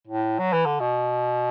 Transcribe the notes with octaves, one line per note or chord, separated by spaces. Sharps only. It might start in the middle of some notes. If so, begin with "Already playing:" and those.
A2
F#3
E3
D3
B2